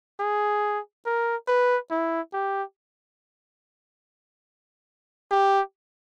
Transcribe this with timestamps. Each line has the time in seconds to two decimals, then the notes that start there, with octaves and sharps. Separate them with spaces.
0.20 G#4
1.06 A#4
1.48 B4
1.91 E4
2.33 G4
5.31 G4